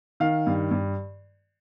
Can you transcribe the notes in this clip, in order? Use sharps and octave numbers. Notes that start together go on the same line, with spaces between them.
D#3 F5
G2
G2